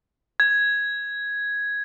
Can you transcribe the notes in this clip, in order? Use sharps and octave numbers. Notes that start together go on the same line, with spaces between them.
G#6